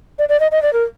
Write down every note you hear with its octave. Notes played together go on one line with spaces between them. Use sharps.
D5
D5
D#5
D#5
D5
A#4